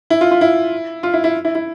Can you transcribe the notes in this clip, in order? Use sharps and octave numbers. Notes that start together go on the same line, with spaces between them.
E4
F4
F4
E4
F4
E4
E4
E4
E4